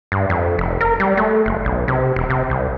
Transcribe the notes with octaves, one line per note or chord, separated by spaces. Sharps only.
G2
F2
F1
A#4
G3
A3
F#1
B1
C3
E1
C3
C2